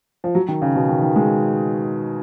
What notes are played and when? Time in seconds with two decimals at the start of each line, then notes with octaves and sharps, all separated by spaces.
0.24 F3
0.35 F#3
0.48 D#3
0.62 C#3
0.76 B2
0.89 D#3
1.02 D#3
1.16 G#3